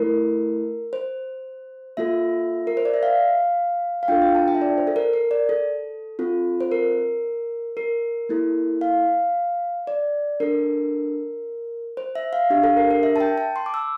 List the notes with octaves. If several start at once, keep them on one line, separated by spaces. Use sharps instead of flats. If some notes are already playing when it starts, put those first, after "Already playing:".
Already playing: A3 E4 A4 A#4
C5
A#3 F4 A4 E5
A#4
C5
D5
E5
F5
F5
D4 F4 A4 G5
G5
A5
G5
E5
D5
C5
A4
A#4
A#4
D5
A4
C4 F4 A4
C5
A#4
A#4
A#3 E4 A4
F5
D5
D4 A4 A#4
C5
E5
F5
D4 G4 F5
A4
A#4
A#4
E5
A5
G5
A5
C6
D6
E6